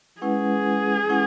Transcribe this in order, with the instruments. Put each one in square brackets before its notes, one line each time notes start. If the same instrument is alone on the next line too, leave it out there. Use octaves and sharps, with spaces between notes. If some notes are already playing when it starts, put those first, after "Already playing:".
[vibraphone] G#3 C#4 E4 B4 F#5 [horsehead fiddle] G#4
[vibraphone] G#3 C#4 E4 B4 F#5